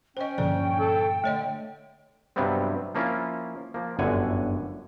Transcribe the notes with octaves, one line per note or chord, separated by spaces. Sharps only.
C#4 C5 D#5 G5
G2 A#2 D3 F3 C5 D5
A4
D3 A3 C#5 D#5
G2 C3 F#3 G3 B3 C4
F3 A#3 C#4 E4 F4
F3 A#3
G1 F#2 A2 D3 F#5 G#5